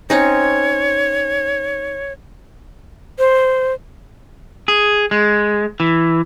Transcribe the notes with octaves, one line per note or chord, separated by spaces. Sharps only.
C4 C#4 D#4 C#5
C5
G#4
G#3
E3